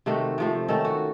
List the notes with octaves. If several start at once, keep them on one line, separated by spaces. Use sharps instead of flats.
C3 D#3 A3 F#4
C3 F3 A3
D#3 A3 C#4 A4
F#4